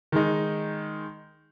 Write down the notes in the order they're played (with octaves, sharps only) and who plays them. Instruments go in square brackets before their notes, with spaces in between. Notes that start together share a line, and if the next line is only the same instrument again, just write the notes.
[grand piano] D#3 G#3 D#4